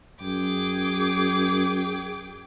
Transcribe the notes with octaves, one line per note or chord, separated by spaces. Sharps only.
F#2 G#4 G5 D6